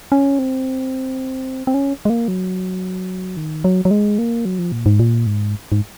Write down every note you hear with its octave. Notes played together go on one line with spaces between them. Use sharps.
C#4
C4
C4
C#4
G#3
A#3
F#3
D#3
F#3
F#3
G#3
A#3
F#3
F3
A#2
G#2
A#2
G#2
G#2